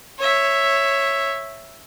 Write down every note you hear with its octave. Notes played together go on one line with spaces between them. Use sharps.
C#5 E5